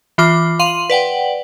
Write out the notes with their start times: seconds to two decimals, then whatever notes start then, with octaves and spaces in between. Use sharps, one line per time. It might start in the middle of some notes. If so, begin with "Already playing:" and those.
0.18 E3 F4 D6
0.59 F5 C6 D#7 F#7
0.90 B4 D5 F#5 G5